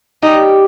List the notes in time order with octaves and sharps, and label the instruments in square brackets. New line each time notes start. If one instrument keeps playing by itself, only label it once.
[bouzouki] G3 C#4 G4 [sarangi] D#4